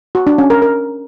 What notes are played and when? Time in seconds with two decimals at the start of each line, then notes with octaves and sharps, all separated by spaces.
0.15 F#4
0.27 D4
0.38 C#4
0.50 A#4
0.62 A#4